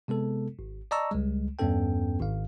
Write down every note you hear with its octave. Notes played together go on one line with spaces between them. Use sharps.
C3 G#3 B3 A4
G#1
D5 D#5 A5 A#5 C#6 E6
C#2 G3 G#3
E2 G2 B3 C#4 A4 G5
G#1 F5